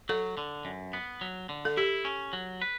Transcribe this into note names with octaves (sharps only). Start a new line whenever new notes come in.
F#3 A4
D3
F#2
B3
F#3
D3
A4
E4 G4
C#4
F#3
B4